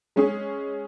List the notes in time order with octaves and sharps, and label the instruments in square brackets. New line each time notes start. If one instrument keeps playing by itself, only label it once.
[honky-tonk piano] G#3 C#4 G#4